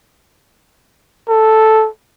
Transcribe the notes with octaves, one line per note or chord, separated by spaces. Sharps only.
A4